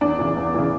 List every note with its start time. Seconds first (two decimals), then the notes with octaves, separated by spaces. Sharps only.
0.01 E2 D4
0.19 C#3 E3
0.37 E2
0.54 C#3 E3